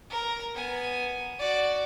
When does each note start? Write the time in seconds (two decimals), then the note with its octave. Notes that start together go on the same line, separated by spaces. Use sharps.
0.10 A#4
0.54 B3 G#5
1.39 F#4 D5